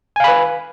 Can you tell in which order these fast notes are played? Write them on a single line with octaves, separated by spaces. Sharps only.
G#5 F5 B5 B4